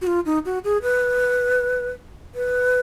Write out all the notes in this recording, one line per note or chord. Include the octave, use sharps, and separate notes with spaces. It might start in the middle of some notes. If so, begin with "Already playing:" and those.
F#4
F4
D#4
F#4
G#4
B4
B4